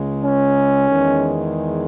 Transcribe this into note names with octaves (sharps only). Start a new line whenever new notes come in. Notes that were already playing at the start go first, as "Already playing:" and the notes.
Already playing: C#2 C#3 G#3
C#4
E2 D#3 G#3